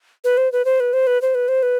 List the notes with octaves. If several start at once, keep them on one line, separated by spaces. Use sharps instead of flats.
B4
C5
B4
C5
B4
C5
B4
C5
B4
C5
B4